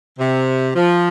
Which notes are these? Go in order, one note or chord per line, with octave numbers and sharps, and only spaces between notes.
C3
F3